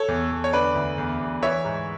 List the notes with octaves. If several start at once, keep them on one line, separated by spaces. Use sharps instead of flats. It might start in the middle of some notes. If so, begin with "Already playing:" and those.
Already playing: A4 C#5
E2
E2
C#5
D3 B4 D5
D2
E2
E2
E3 C#5 E5
G#2